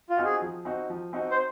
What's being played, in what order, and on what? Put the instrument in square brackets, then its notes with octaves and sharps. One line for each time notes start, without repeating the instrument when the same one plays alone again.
[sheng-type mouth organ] F4
[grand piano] C4 D#4 F#4
[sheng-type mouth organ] G#4
[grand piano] F3
C4 D#4 F#4
F3
C4 D#4 F#4
[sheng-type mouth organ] C5